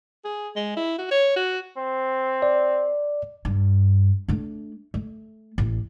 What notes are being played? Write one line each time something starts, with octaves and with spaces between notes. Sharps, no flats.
G#4
G#3
E4
F#4
C#5
F#4
C4
D5
G2
A3 D4
A3
A1